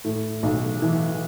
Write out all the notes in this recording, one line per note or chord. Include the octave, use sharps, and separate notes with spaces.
A2
B1
E3